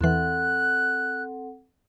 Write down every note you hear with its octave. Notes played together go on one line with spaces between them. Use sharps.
E2 E3 C4 A4 F#5 F#6